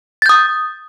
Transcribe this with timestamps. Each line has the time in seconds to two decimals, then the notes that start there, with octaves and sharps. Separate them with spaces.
0.22 A6
0.26 G6
0.29 D#6